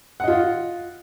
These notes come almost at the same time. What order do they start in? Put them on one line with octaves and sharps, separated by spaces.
F#5 D#5 F4